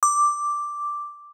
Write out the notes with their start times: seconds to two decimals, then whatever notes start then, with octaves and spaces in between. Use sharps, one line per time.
0.03 D6